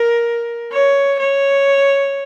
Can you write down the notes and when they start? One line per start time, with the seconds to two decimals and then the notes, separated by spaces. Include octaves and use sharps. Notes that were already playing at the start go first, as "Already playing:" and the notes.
Already playing: A#4
0.72 C#5
1.19 C#5